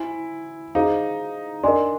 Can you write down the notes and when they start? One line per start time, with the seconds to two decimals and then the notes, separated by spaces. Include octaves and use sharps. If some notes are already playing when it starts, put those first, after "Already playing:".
Already playing: E4 C5 E5 G#5 C6
0.75 D#4 G#4 C5 F5
1.63 D4 A#4 D#5 G#5 C6